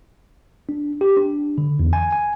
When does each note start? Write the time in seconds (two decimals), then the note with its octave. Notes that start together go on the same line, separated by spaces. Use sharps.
0.69 D4
1.01 G4
1.17 D4
1.58 D3
1.80 E2
1.93 G#5
2.13 G#5